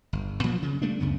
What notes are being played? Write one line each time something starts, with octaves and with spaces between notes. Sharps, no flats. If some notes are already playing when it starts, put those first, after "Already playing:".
G1
A#2 F3 F#3 A#3
C#3
G3 A3 A#3 D4
C#2 F#2 C#3 B3